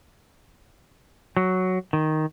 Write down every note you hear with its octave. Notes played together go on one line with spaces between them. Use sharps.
F#3
D#3